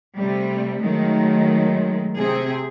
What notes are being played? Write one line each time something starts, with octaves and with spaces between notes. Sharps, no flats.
C3 G3 A3
D#3 F#3 G#3 A3
C3 C4 G#4